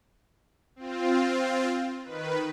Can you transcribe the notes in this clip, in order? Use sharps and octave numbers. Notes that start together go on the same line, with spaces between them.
C4 F4
D#3 B4